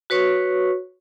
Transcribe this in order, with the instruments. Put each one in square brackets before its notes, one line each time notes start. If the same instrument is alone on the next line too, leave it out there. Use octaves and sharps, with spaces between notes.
[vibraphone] F#4 B4 C#5 C#6